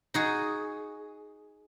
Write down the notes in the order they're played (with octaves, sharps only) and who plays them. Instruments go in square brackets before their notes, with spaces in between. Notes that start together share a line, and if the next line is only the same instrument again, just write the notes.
[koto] D#4 F#4 G#4